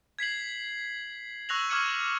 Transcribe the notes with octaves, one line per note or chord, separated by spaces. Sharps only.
G#6 B6 C7 F#7
C#6 E6 F#6 A#6 F7 F#7
C#6 D6 F6 G#6 C#7 D#7